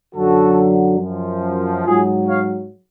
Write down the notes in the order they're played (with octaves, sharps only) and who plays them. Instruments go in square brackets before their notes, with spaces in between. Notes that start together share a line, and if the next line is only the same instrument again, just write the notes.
[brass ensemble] F#2 D3 F#3 F#4 A4
F#2 F3
G#2 F#3 F4 G#4
C#5 F5